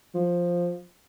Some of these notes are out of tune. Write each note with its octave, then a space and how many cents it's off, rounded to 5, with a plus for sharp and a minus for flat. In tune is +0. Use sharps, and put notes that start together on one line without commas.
F3 +5